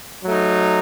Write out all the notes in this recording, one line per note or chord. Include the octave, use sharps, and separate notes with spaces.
F#3 A3 D#4